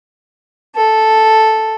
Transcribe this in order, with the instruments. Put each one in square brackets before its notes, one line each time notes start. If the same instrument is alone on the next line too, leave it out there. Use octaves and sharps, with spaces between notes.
[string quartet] A4